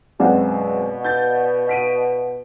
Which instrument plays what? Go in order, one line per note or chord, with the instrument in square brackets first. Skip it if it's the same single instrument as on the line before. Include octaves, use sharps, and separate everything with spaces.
[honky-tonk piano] F#2 G#3 C4 [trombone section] B2 [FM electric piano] D5 F5 F#5
[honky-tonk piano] G6 A6
B6 D7 D#7